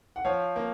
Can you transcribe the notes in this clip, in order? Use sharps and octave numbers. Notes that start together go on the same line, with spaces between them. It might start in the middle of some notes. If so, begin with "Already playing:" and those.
F#5
F3 C#5 F5
A#3